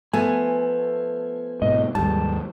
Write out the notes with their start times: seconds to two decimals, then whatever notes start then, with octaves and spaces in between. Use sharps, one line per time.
0.13 F3 A3 B3 G#5
1.62 G#2 B2 D#5
1.95 D#2 G#2 G3 A5